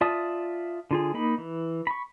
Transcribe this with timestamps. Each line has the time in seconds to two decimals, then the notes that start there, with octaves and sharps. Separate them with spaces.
0.01 F4 D5 E5 A5 D#6
0.91 D3 F4 G#4
1.14 A#3 D#4 B5
1.38 E3
1.87 B5 C#6